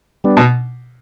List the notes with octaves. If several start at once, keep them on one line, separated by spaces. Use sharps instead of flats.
G3 B3 D4
B2